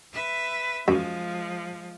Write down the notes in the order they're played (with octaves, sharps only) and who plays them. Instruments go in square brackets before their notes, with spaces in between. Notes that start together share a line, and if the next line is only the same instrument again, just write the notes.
[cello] B4 E5
[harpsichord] F#2 [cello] F3 G#3